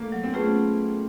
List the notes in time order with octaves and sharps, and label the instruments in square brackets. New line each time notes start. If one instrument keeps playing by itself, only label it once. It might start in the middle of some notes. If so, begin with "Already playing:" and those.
Already playing: [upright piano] A3 A#3
[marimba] F#3
[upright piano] C4
[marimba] A3 C#4 F4 G#4 [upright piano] B3